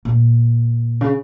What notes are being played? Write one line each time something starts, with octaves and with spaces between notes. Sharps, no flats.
A#2
C#3